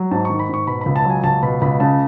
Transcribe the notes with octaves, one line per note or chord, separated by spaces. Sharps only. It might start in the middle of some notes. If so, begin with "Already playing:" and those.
Already playing: F#3
G#2 A5
D#3 C#6
B5
G#2 C#6
B2 B5
C#2 B5
A5
F#3 G#5
C#2 A5
B2 B5
C#2 B5
C#3 A5